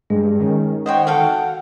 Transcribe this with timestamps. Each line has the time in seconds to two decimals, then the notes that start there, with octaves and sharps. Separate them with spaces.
0.10 G2 G#3
0.39 D#3 C#4
0.86 C5 C#5 D#5 F#5 G5
1.07 F#4 A4 F5 G5